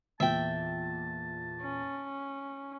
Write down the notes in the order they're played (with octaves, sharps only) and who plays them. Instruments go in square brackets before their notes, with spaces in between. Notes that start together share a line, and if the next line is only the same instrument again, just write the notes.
[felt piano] E2 A#2 [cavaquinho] E5 G5 [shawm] A5
[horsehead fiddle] C#4